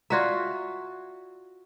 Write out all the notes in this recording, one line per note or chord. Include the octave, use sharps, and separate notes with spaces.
F4 F#4 D5 E5 A#5